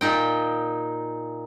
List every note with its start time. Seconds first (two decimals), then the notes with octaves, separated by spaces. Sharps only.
0.01 A#2 D#4 G5